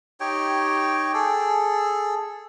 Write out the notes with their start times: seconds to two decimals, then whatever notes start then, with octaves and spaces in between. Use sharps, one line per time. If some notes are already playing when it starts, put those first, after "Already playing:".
0.20 D#4 G4 C#5 G5
1.14 G#4 A4